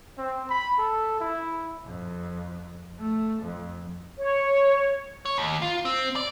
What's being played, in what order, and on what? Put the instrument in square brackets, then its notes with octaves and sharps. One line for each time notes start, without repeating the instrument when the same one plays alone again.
[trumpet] C4
B5
A4
E4
[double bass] F2
A3
F2
[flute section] C#5
[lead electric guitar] C#5
D#2
F4
C4
D5